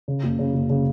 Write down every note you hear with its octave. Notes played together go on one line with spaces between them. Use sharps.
C#3
F#1
C#3
F#1
C#3